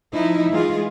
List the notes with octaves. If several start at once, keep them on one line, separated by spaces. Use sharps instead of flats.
F3 D#4 E4
E3 G#3 F4 G#4